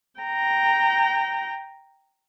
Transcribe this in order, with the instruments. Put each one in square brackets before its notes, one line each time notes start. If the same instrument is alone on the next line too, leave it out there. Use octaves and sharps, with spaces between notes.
[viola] G5 A#5